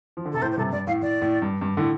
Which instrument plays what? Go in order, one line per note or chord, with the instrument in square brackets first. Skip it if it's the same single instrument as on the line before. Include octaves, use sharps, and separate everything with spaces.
[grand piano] F3
D3
[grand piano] C3 [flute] A4
[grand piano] A2 [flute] C5
[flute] C5
[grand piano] G2 C3 [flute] A4
[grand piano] G2 [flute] D5
[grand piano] A2 [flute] F5
[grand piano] A2 [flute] D5
[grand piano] A2
G2
G2
A2 D3